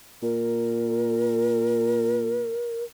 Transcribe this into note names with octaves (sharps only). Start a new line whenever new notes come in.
A#2 A#4